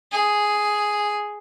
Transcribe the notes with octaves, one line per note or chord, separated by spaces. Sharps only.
G#4